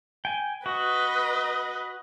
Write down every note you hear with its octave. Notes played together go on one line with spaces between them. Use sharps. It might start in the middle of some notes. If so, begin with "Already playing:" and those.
G5 G#5
F#4 B4 D#5